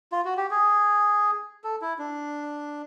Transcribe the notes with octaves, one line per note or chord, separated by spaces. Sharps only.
F4
F#4
G4
G#4
A4
E4
D4